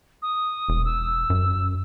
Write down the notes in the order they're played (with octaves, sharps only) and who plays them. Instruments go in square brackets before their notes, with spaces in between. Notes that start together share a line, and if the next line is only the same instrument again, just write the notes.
[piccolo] D#6
[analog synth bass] E1
[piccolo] E6
[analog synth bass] F#2